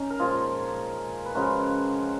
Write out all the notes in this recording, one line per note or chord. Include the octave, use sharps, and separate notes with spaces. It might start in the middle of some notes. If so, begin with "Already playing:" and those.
Already playing: C#4 D#4
A#4
A#2 F3 G#3 F4 G#4
B4
C#3 F3 G#3 F#4 A#4